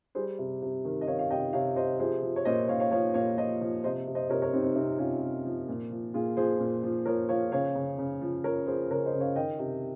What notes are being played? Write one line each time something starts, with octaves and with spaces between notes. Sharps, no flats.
G3 G#4 C5
C3
C3
D#3
D#5
D#3 C#5 F5
F5
C3 D#5 G5
C3 C#5 F5
C3 C5 D#5
F3 G#4 C5
F3
C#5
A#2 C5 D#5
A#2 C#5 F5
C#5 F5
F3 C#5 F5
A#2 C#5 F5
F3 C5 D#5
F3
C3 C5 D#5
C3
C5 D#5
C3 A#4 C#5
A#4 C#5
C3 C4 D#4
C4 D#4
C3 C4 D#4
C3 C#4 F4
C3
F3
A#2
F3
A#2 F4 G#4
F3 G#4 C5
A#2
F3
F3 A#4 C#5
F3 C#5 F5
C#3 C#5 F5
C#3
C#3
F3
F3 A#4 C#5
F3 G#4 C5
C#3 A#4 C#5
C5 D#5
C#3
C#5 F5
D#3 D#5 G5
C3